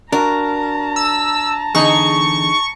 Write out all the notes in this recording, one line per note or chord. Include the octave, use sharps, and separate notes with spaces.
D4 F#4 A#4 A5 A#5
E6
E2 D3 D#4 G#4 C#6